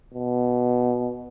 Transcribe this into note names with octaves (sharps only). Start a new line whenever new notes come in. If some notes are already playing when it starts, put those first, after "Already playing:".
B2